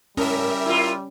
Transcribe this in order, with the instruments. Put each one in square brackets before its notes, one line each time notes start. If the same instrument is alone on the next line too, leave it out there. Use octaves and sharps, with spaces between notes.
[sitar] G#2 [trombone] G3 [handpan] C#4 [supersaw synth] A#4 E5
[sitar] E4 F4